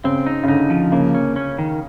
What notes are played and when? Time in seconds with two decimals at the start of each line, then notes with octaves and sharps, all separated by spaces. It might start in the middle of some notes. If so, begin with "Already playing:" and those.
0.04 C#3 C4
0.26 D#4
0.43 C#3
0.48 D3 D#4
0.70 F3
0.92 C#3 A#3
1.14 C#4
1.36 C#4
1.58 D#3